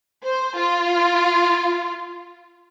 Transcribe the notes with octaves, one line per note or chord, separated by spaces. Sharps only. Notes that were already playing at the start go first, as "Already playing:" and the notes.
C5
F4